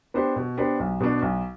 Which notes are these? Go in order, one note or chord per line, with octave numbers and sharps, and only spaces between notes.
B3 D4 G4 C5
B2
B3 D4 G4 C5
B1
B2 B3 D4
B1